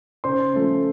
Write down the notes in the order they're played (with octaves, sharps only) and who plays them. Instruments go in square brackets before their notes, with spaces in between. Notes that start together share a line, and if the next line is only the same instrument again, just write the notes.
[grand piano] C#3 C5 C6
F3 A3 C#4